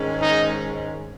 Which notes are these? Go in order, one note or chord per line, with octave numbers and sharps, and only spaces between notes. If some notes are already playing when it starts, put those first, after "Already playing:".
Already playing: G#2 D#3 G#3 C#4
D#4